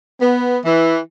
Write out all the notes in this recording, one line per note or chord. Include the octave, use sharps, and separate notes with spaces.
B3
E3